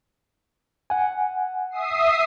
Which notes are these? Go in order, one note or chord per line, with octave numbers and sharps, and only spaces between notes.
F#5 G#5
E5 D#6 C7